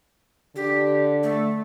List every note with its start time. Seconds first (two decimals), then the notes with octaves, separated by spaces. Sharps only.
0.56 D3 G4
1.23 A3